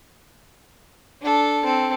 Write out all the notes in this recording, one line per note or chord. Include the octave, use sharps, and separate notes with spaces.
D4 A4
C4 A4